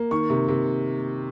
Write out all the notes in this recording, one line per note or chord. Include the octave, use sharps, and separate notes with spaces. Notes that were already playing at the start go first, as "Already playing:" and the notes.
Already playing: A#3
D#3 C#6
C3
C3